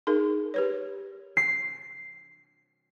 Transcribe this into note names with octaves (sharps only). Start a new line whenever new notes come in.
D#4 G#4 A#4
G4 B4 C#5
C7